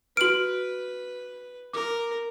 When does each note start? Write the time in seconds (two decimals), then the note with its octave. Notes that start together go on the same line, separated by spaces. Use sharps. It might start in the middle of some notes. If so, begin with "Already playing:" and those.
0.17 F#4 B4 F6 D7 F#7
1.73 A#4 D6